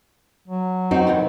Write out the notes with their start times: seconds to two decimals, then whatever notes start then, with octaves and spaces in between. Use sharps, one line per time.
0.48 F#3
0.91 F#2 C4 D#4 F#4
1.07 C3 D#3 E3